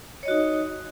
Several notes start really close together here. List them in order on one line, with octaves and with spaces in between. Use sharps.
C#5 D#5 F#4 D#4